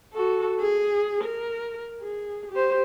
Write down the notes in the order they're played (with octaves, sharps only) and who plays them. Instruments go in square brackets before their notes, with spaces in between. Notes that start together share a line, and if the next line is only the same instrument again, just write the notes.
[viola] F#4 A4
G#4
A#4
G#4
G4 C5